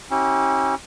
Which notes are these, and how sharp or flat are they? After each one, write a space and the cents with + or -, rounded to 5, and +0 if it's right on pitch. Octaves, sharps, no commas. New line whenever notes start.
C#4 -30 E4 -45 G4 -40